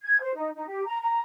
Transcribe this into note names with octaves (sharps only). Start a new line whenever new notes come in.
G#6
C5
D#4
D#4
G4
A#5
A#5